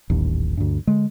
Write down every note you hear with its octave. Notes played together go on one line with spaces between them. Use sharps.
D#1 A1 D#2
D2 G2
D3 G#3